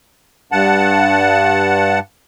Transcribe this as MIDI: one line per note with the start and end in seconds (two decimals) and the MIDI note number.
0.52 1.99 43
0.52 1.99 78
0.52 1.99 81